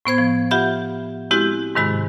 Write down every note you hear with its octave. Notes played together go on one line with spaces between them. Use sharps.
A2 B3 C5 G#6
F3
F4 G4 E5 F#5 B5
G#3 C4 E4 F#4 G4
G#2 C3 D#3 G#3 F#4 B5